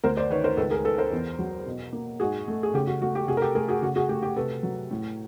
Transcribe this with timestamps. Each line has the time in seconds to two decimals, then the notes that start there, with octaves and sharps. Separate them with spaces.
0.04 D2 A#4 C5
0.17 C5 D5
0.30 D#3 B4 C#5
0.44 A#4 C5
0.57 C#2 A4 B4
0.71 G#4 A#4
0.85 G#3 A4 B4
0.98 A#4 C5
1.12 E2
1.39 F#3
1.66 B2
1.93 A#3
2.20 G#2 F#4 G#4
2.48 A3
2.63 G#4
2.74 C#3 G4
2.87 F#4
3.01 A3 F#4
3.15 G4
3.28 C3 F#4 G#4
3.37 A#4
3.42 G4 A4
3.55 A3 G#4 A#4
3.68 F#4 G#4
3.82 C#3 F#4
3.96 F#4 G#4
4.09 A3 G4
4.22 G4
4.36 C3 A4 B4
4.63 F#3
4.91 A2